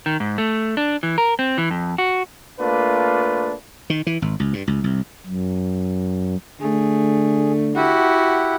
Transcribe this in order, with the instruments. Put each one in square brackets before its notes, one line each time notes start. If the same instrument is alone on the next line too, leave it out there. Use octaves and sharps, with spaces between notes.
[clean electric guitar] D#3
G#2
A3
D4
E3
A#4
C4
E3
F2
F#4
[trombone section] A3 A#3 D4 F4 B4
[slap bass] D#3
E3
G#1
C#2
G2
C#2
C2
[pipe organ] F#2
[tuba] D3 [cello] A3 [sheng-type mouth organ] G#4
[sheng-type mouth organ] E4 G4 F#5 [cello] F#4